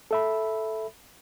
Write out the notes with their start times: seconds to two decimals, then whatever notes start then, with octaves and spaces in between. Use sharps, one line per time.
0.11 A4 E5 B5